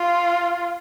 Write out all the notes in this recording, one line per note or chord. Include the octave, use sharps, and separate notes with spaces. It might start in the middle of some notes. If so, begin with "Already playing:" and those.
Already playing: F4